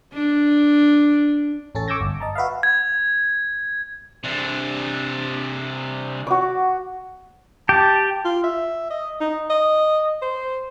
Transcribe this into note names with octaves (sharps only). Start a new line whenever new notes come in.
D4
A1 C#4 A4 A6
C#6 D6 E6 G6 G#6 A#6
G1
D#5 A5 A#5
F#4 B4 E5 F5
G#6
C3 D4
F#4 D6
G4 A5
F4
E5
D#5
D#4
D#5
C5